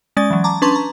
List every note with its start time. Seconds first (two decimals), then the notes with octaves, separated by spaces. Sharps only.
0.17 G#3 C#4 D5 A6
0.30 E3 F#3
0.44 A5 A#5 D6
0.62 C#4 D4 B4 A5 C6 C#6
0.76 A#5